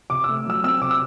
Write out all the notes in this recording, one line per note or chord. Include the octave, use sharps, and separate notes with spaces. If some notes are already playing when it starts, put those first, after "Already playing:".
C3 D6
A3 E6
F#3 E6
C4 E6
C3 D6
E6